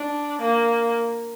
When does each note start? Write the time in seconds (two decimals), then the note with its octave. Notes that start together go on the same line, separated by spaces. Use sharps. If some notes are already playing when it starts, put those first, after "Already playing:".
Already playing: D4
0.41 A#3